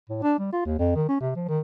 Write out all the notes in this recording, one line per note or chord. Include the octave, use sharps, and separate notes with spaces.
A2
D4
G3
F4
D#2
F2
D#3
C#4
C3
F3
D#3